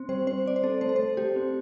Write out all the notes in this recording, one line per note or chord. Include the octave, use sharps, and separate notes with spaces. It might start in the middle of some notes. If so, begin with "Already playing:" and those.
Already playing: C4
G3 C5
C4 C5
C4 D5
C5
C4 A4
A3 C5
A4
C5
A3
A3 G4
C4